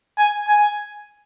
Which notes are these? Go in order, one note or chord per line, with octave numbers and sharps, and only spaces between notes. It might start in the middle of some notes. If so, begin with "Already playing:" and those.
G#5
G#5